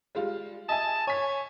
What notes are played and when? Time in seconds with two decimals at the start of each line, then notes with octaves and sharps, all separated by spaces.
0.15 G3 G#3 F4
0.69 D#5 E5 G#5 A5
1.07 C#5 G#5 B6